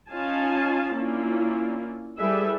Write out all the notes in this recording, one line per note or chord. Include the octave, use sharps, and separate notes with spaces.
C#4 D#4 F4 F5 G#5 A5
A#3 C#4 D4 E4 F4
G3 E4 G#4 A4 B4 E5